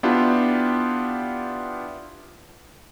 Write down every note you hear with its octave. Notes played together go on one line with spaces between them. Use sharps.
B3 D4 E4 F4 G4